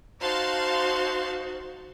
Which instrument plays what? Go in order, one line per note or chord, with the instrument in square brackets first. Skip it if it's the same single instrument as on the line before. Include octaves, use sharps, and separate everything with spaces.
[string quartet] D#4 F#4 C5 [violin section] F5 A5 C6